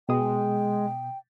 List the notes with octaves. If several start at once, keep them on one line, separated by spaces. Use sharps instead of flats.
B2 G#3 G5 D#6